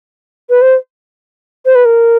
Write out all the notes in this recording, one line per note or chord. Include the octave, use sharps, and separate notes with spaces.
B4
C5
C5
B4
A#4